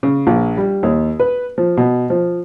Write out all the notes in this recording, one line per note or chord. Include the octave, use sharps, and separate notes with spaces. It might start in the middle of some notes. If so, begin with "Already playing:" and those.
C#3
A#1
G3
D#2
B4
F3
B2
F3